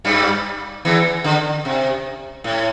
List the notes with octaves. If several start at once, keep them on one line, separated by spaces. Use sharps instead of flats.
G2 G3
E2 E3
D3
C3
A2